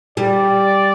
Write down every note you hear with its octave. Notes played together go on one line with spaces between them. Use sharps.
G3 D5